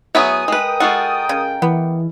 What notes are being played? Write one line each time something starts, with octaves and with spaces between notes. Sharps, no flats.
F#3 A3 B3 E4 G#4 E5 D#6
G#3 A#4 B4 G5
G#3 F4 F#4 A4
C#3
E3 B3